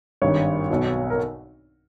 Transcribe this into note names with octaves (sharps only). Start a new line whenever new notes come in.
G#1 G2 D#3 C#5
B1 B2
A#4